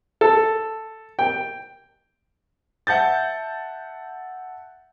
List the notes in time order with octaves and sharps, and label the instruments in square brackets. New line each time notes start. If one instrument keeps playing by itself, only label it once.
[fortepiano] A4
G5
[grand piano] E5 F#5 A5 G6 A6